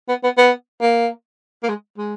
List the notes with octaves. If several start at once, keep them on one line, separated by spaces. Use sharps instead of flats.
B3
B3
B3
A#3
A#3
G#3
G#3